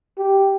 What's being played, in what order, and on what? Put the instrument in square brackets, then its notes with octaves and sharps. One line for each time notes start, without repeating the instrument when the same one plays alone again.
[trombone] G4